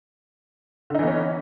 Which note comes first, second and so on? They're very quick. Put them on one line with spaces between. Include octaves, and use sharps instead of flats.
D3 D#4 E3 B3 C#4